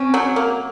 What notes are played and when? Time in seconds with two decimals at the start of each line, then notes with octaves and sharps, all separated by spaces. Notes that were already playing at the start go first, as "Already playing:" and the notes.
Already playing: C4 C#4
0.14 F#3
0.36 A#3